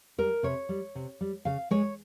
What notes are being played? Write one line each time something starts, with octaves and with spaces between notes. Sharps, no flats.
G3 A#4
C3 C#5
G3
C3
G3
C#3 F5
G#3 C#5